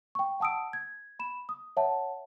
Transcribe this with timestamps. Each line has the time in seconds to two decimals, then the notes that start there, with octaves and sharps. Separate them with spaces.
0.15 G5 C#6
0.40 F#5 A5 D#6 E6 D7
0.73 G#6
1.19 B5 E7
1.49 D#6
1.77 C#5 E5 F#5 A5